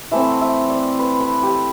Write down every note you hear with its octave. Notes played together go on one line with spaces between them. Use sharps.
E3 A3 C4 E5
E5
D5
B4
B4
G4